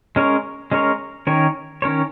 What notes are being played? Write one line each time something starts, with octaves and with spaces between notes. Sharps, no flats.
G#3 C#4 A#4 C#5
G#3 C#4 A#4 C#5
D#3 C#4 A#4 C#5
D#3 C#4 A#4 C#5